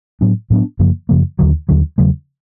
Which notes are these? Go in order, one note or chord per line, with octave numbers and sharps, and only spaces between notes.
A2 F#3 B3 D4
A2 F#3 B3 D4
F#2 C#3 F3 A#3
F#2 C#3 F3 A#3
D#2 D3 F#3
D#2 D3 F#3
E2 C#3 F#3 A3